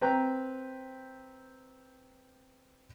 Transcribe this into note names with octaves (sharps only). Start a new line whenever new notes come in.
C4 B4 G5 A#5